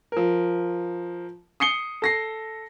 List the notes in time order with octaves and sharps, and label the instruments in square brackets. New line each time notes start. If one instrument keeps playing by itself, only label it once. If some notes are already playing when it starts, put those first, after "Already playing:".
[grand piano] F3 A#4
D#6 C7 C#7 G7
A4 A#6 C7